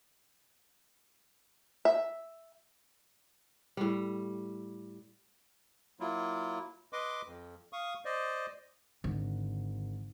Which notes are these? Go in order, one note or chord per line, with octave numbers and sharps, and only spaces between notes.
E5
A2 G3
F#3 A#3 E4 F4
B4 D#5 C6 D6
F2
F5 C#6 D#6
C5 D5 D#5
G#1 D3